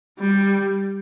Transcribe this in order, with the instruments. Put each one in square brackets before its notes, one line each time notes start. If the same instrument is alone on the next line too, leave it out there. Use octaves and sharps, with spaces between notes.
[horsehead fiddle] G3